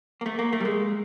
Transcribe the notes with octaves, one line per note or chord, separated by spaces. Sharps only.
A#3
A3
A#3
A3
G3
G#3